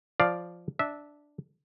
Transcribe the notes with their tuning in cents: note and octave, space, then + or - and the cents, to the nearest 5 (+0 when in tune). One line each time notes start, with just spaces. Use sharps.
F3 +0 D5 +0 F5 +0
D4 +0 E5 -15